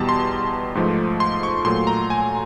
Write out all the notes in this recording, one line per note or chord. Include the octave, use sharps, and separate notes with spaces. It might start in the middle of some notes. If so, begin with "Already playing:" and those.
Already playing: E2 B2 G3 A5
C6
G#2 F3 A3
C6
C#6
A#2 F#3 A3 C6
A#5
G#5